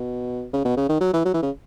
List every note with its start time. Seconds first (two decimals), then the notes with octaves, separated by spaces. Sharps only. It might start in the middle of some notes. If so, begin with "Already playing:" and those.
Already playing: B2
0.53 C#3
0.65 B2
0.77 C#3
0.89 D#3
1.01 F#3
1.13 E3
1.25 F#3
1.34 E3
1.42 C#3